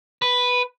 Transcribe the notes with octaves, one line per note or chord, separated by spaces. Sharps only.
B4